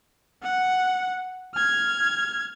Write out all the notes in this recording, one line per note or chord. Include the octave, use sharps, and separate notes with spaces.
F#5
F6 G#6